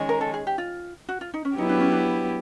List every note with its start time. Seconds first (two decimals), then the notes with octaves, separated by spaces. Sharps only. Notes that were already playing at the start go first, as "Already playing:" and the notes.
Already playing: D#3 G#3 C#4
0.09 A#4
0.21 A4
0.34 G#4
0.47 G4
0.58 F4
1.09 F#4
1.21 F4
1.34 D#4
1.45 C#4
1.58 F#3 B3 D#4 E4 G4 B4
1.69 D4
1.80 C#4
1.92 D4